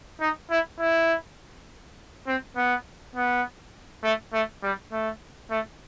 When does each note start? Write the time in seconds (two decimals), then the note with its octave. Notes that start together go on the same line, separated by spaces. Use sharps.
0.20 D#4
0.50 E4
0.80 E4
2.27 C4
2.56 B3
3.15 B3
4.04 A3
4.33 A3
4.63 G3
4.92 A3
5.51 A3